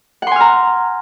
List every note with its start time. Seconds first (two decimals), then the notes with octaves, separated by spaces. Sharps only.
0.22 F#5
0.27 C6
0.31 G#5
0.36 F6
0.41 A#5